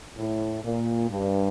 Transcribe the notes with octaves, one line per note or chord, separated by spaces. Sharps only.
A2
A#2
G2